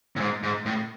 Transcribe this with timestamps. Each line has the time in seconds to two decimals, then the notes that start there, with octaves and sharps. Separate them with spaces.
0.16 A2
0.20 G#2
0.43 G#2
0.66 A2